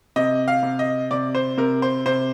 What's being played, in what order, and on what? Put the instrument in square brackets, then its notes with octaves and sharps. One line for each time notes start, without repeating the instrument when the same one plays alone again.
[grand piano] C3 D#5
F5
C3
D#5
C3 D5
C5
C3 A#4
C5
C3 C5